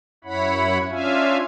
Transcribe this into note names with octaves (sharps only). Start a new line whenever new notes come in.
F#2 E4 C#5 F#5 B5
C#4 D4 F4 E5 F5 G#5